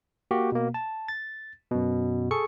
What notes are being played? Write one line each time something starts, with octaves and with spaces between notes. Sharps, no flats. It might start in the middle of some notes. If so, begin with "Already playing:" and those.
A#3 F#4 G4
B2 A#3
A5
A6
F#2 B2
G#4 A4 C#6 C#7